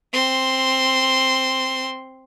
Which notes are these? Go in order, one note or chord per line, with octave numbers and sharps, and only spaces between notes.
C4 C6